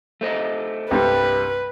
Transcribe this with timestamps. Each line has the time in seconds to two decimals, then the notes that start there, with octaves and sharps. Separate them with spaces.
0.21 A3 C5 D#5
0.91 C2 G2 G3 B4